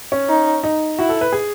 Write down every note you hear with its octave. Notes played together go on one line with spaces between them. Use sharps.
C#4
D#4
D#4
E4 F#4
A4
B4
G#4